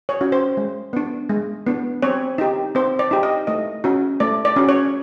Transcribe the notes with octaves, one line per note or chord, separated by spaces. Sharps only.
C#5
C#4 F#4
C5
G#3
B3 D4
G#3
B3 D4
C4 C#5
D#4 G4
C4 C5
D5
D#4 G4
D#5
A3 D#5
C#4 F#4
A3 D5
D5
C#4 F#4
C#5